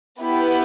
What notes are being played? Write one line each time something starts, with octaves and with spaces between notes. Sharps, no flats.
B3 E4 G4 B4